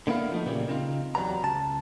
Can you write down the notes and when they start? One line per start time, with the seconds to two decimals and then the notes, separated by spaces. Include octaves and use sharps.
0.07 D3 A#3 B3 E4 F5
0.32 F3 A3 D#4
0.46 A#2 C#3 E3 G3 A#3
0.68 C#3 C4 D#4 F4
1.15 E2 F#3 G3 B3 A#5
1.43 C#2 A5